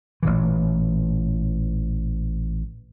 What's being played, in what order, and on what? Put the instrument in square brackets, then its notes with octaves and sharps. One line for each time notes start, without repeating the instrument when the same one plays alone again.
[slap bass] A1 A#2 E3